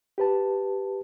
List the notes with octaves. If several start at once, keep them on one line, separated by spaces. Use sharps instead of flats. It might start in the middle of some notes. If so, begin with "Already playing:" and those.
G4 B4 A5